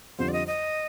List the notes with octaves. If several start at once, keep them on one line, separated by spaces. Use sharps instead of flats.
F2 D3 G3 C4 F4 C5
D5
D#5
D#5